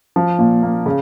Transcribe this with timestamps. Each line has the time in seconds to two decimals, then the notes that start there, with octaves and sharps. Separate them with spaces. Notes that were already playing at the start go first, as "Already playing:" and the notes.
0.16 F3
0.39 A#2
0.63 A#3
0.86 C#3